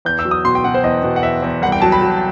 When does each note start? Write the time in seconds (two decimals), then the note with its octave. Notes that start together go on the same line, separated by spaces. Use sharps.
0.05 E2 G6
0.19 E6
0.25 F#3
0.31 D#6
0.45 B2 C6
0.55 G5
0.64 B2 F#5
0.74 C5
0.83 E2 D#5
1.03 B2
1.16 F#5
1.23 E2 E5
1.43 E2
1.62 C2 F#5
1.72 G5
1.82 F#3 A5
1.92 B5
2.02 F#3